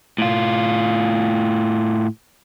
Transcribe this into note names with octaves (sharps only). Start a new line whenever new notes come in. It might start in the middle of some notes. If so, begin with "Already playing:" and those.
A2 F4